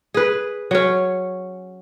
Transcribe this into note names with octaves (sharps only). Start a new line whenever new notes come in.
G#4 B4
F#3 C#4